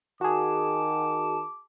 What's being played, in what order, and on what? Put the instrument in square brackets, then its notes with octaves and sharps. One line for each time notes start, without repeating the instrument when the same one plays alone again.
[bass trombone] D#3 [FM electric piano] F#4 G#4 [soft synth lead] A5 [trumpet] D6